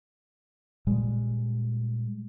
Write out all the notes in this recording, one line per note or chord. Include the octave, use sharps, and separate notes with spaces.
A#2 G3 G#3